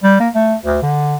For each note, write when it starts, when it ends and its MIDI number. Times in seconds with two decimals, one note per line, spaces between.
0.03 0.16 55
0.20 0.29 58
0.34 0.55 57
0.65 0.78 38
0.82 1.16 50